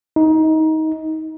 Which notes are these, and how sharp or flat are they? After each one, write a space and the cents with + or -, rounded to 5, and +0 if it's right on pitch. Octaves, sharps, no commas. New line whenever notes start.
D#4 +20